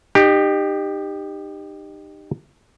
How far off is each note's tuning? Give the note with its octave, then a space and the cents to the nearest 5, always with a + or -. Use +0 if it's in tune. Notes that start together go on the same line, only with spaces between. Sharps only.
D#4 -30 G4 +10